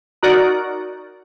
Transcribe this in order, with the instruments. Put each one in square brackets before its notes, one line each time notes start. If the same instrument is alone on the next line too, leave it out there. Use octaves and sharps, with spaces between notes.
[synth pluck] D#4 F#4 A#4 D5 F#5